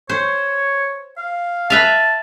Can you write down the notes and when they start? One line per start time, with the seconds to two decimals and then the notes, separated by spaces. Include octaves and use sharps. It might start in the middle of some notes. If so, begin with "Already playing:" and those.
0.09 C5 C#5
1.17 F5
1.70 B4 E5 F5 A5